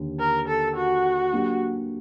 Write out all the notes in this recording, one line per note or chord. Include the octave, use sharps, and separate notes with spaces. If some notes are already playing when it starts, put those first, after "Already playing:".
Already playing: D#2 D3
A#4
A4
F#4
F#3 A#3 D4 G4